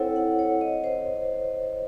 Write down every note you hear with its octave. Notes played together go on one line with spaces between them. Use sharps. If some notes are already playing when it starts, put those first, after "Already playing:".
Already playing: C4 E4 A4 C#5 F#5
F#5
C#5
D#5
C5